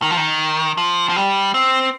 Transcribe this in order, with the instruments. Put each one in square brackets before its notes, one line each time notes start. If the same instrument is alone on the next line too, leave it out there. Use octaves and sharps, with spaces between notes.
[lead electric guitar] D#3
F3
D#3
F3
F3
G3
C4